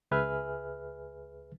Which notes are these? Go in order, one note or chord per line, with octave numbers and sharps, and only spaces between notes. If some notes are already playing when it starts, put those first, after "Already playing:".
C#2 G#4 B4 E5 G#5 F6